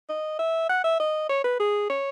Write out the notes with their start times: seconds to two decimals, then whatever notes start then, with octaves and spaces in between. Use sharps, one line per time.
0.09 D#5
0.39 E5
0.69 F#5
0.84 E5
1.00 D#5
1.29 C#5
1.44 B4
1.60 G#4
1.90 C#5